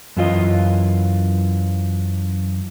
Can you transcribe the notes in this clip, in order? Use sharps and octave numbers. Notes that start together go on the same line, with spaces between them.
F#2 E3 F4 D#5